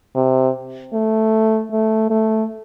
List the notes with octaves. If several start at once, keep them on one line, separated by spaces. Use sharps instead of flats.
C3
A3
A3
A3